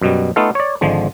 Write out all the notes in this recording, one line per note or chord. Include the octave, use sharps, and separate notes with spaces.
F#2 B2 G3
A3 B3 D#4 F4 A4 F5
C#5 D5
G#1 D3 F3 G#3